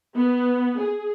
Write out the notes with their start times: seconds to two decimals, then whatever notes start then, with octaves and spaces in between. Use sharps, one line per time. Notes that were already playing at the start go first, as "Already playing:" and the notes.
0.16 B3
0.81 G#4